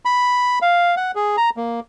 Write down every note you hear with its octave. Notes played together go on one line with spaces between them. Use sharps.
B5
F5
F#5
G#4
A#5
A#3